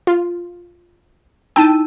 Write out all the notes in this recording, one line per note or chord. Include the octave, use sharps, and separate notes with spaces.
F4
D#4 E4 G5 A5 E6 D#7